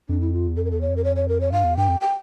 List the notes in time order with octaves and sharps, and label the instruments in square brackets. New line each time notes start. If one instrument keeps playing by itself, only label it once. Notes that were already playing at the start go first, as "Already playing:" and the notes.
[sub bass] F2 [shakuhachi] D4
[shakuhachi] E4
F4
[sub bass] E2
[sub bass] F2 [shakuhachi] A4
[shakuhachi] A#4
[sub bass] E2 [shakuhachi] A4
[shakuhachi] C#5
[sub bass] F2
[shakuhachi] A#4
C#5
C#5
A#4
C#5
[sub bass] G2 [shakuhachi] F5
[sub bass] E2
[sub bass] G2 [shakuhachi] G5
[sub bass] F2
[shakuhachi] G5